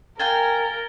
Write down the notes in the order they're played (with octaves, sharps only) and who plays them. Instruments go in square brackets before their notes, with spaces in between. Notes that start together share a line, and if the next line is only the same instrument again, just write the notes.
[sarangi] A#4 [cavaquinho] F5 G5 G#5 [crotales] G#6 A6 G7